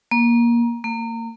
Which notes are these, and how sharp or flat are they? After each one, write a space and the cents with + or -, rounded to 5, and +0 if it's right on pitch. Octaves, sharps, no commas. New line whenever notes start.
A#3 +20
A#3 -30